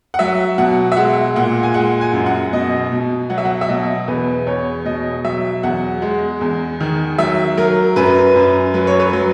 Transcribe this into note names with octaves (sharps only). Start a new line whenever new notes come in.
F#5
F#3 E5
B2 F#5
E5
G#3 F#5
A#2 F#5
G#5
G#3 F#5
G#5
F#2
F#5
B2 D#5
B2
F#3 F#5
E5
F#5
E5
B2 D#5
E2 B4
E2 C#5
B2 D#5
F#3 E5
E2 F#5
G#3
E2
D#3
F#3 E5
F#3 A#4
F#2 B4
F#2
F#3 B4
C#5
B4
F#3